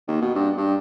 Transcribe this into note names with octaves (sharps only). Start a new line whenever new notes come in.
D#2
B2
G2
G2